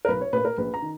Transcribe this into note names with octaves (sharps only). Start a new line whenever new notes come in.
A#4
B1 B4
C#5
A#2 A#3 B4
A#4
A#1 B4
A#5
D#3